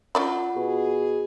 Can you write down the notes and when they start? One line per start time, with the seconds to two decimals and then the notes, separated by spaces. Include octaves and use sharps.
0.15 C#4 F4 D5 F#5 B5
0.56 B2 G#4